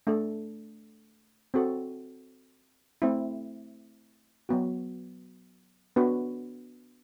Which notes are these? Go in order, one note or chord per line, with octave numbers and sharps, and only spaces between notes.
A3 D4 A4
C4 F#4 A4
A3 C4 E4
F#3 B3 F#4
B3 D4 F#4 B4